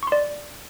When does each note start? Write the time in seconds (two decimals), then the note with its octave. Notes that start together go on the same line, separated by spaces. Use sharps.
0.03 C#6
0.07 C6
0.12 D5